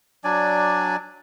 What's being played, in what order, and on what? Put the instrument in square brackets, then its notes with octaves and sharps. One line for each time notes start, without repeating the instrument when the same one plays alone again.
[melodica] F#3 D4 D5 G#5